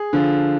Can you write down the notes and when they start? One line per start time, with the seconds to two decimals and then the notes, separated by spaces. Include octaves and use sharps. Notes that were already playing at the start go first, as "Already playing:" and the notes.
Already playing: G#4
0.13 D3 F3